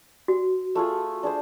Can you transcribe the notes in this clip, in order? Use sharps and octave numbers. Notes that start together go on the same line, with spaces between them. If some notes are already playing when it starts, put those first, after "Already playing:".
F#4
A3 F4 G#4
D4 G#4 C5